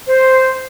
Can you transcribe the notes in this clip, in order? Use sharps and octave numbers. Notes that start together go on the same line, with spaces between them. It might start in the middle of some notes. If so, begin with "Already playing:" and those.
C5